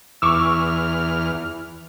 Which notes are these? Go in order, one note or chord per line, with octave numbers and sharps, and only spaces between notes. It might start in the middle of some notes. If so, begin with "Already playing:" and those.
E2 C#6 D6 E6 F6